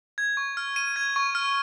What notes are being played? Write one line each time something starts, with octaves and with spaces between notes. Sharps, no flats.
G#6
C#6
F6
D#7
G#6
C#6
F6